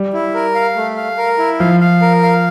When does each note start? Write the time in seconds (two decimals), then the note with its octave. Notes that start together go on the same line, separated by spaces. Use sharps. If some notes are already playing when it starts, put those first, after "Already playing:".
Already playing: G3
0.13 E4
0.34 A#4
0.55 F5
0.76 A3
0.97 F5
1.18 A#4
1.38 E4
1.60 F3 F5
1.80 F5
2.02 A#4
2.23 F5